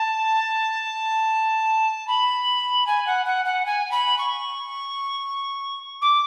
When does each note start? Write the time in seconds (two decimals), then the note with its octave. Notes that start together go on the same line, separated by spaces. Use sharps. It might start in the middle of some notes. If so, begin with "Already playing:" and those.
Already playing: A5
2.07 B5
2.86 G#5
3.06 F#5
3.25 F#5
3.45 F#5
3.65 G#5
3.91 B5
4.18 C#6
6.01 D6